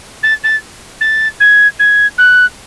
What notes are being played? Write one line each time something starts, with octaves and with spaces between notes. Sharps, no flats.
A6
A6
A6
G#6
G#6
F#6